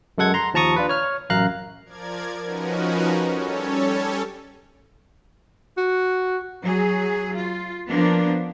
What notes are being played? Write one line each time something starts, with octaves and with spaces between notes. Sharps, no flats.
F#2 G#3 A4 F#5 G#6
A#5 C6
D#2 F3 A5 A#5 C#6 D#6
D4 F4 B4
C#5 F6
A1 F#2 F5 A#5 F#6
F3 A#4 D5 G#6
F3 C#4 D#4 F#4 A#4 B4
G3 C#4 A4 C#5
F#4
F#3 G#4
F4
F3 A#3 B3 D4